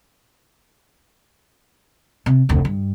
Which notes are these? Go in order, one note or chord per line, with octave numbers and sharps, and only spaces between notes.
C3
F1 D2
G2